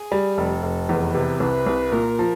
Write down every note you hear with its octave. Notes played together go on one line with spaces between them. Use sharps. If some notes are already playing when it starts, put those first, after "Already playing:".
Already playing: G#4
G3
F1 A4
F1
E2 B4
C3
C2 B4
C2
A#2 A#4
F3